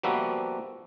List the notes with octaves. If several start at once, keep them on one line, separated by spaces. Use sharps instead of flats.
F3 G3 A#3 B3 F#4 E5